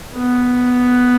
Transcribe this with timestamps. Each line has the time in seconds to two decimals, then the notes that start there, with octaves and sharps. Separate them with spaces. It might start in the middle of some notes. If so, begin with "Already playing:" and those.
0.15 B3